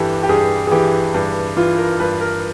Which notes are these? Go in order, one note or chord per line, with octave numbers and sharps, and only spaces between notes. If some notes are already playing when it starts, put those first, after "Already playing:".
Already playing: G2 E3 G4 A4
G4
G2 G#4
G#4
E3 G4
G2
E3 F4
A#4
G2 B4
A#4